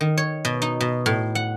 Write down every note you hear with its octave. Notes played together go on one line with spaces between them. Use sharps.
D#3
C#5
B2
D#4
B2
A2
F#5